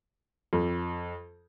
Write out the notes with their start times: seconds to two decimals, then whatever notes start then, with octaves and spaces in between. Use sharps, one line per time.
0.53 F2